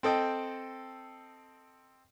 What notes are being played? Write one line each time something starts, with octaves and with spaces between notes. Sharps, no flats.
C4 A4 D#5 G5